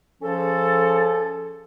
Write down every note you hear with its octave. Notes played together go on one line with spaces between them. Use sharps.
F3 C#4 G#4 A4